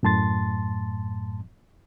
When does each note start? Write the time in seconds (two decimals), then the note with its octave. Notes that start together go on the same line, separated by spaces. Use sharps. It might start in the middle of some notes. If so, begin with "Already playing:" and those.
0.03 F#2 A2 A5 C6 A6